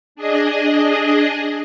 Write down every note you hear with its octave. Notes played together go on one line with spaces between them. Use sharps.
D4 G#4 D#5